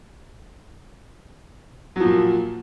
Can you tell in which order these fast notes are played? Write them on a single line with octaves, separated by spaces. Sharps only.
F#3 F3 A#2